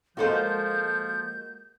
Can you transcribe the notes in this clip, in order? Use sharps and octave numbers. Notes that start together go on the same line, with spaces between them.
F3 G#3 A#3 F4 F#4 A4 C5 G6